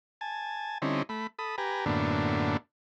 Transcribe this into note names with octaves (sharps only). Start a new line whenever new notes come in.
G#5 A5
D3 G3 C4 C#4 D#4 E4
A3 B5
A4 B5 D#6
G4 B4 G#5 A#5
F#2 A2 D3 A#3 B3 D4